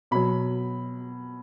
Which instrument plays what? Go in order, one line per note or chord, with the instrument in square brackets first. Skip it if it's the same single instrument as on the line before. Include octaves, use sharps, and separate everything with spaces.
[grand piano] B2 F#3 B5